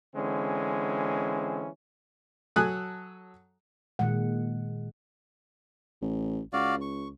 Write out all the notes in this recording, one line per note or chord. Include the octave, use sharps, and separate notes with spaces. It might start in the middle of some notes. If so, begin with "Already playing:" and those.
D3 E3 G#3 C4 C#4
F#3 A4 G#5 D#6 F#6
A#2 D#3 G#3 F#5
A1
C#2 F#4 D5 F5
C#6